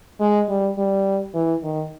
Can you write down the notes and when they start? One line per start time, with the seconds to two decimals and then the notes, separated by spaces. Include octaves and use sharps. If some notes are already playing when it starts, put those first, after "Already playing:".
0.20 G#3
0.49 G3
0.78 G3
1.34 E3
1.63 D#3